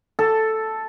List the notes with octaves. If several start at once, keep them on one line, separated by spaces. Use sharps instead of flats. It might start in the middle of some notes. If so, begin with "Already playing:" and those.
A4